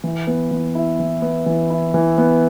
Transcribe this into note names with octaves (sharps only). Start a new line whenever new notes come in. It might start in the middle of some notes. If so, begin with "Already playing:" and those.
E3
B3
E3
E4
E3
B3
E3
E4
E3
B3